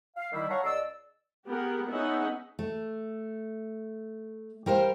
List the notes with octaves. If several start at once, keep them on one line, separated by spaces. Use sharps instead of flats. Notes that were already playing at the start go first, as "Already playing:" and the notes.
F5
D#3 G3 E4
C#5 F5 F#5 A5 A#5 C#6
C#2 D5 D#5 E6
B3 G4 G#4 A#4 F#5
B3 C#4 D#4 G#4 E5 F#5
A3
G3 A#4 C5 F5